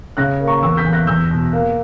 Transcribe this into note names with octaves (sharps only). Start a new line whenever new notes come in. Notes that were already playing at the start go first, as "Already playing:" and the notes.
C#3 F#6 A#6
A#3
A#5 C#6
E2 C#6 E6
G6 B6
E2
F#6 A#6
E2 E6 G6
B2
A#3